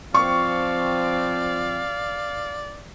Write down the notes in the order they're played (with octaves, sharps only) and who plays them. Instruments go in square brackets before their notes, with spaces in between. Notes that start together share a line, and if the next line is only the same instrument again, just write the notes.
[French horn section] F3 C4 [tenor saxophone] D5 [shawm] F5 [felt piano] C#6